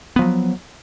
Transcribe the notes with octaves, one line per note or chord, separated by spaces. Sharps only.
F3 F#3 B3